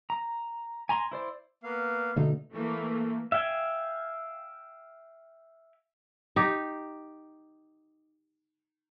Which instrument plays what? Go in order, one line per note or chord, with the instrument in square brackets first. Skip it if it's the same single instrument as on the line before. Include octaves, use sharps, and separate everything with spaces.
[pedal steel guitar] A#5
G#5 A#5 C6
E4 C5 D5
[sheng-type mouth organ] A#3 B3 F5
[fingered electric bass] B2 D3 A3 [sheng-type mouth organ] D#4
[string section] E3 A3 A#3
[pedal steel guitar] E5 F5 G5 G#5
[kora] D#4 G4